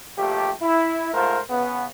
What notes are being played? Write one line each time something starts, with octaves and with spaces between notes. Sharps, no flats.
A#1 A3 G4
E4
G#2 A3 F4 A#4 C5
C#3 B3